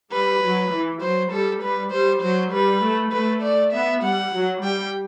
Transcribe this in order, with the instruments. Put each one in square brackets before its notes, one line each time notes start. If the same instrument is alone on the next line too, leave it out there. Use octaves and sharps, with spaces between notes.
[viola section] G3 [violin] B4
[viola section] F#3
E3
[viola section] F#3 [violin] C5
[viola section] G3 [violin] A4
[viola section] G3 [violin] B4
[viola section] G3 [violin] C5
[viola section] F#3 [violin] C5
[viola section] G3 [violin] B4
[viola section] A3
[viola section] A3 [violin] B4
[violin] D5
[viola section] B3 [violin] E5
[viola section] G3 [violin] F#5
[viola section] F#3
[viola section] G3 [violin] G5